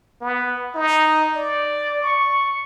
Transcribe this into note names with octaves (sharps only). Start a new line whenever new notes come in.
B3
D#4
D5
C#6